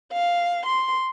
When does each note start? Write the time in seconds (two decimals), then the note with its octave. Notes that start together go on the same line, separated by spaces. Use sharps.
0.12 F5
0.65 C6